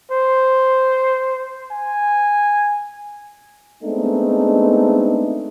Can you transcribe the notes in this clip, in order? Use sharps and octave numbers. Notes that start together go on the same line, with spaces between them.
C5
G#5
G#3 A3 B3 C4 D4 D#4